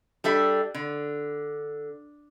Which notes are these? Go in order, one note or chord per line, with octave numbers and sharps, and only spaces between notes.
G3 D4 A4 E5
D3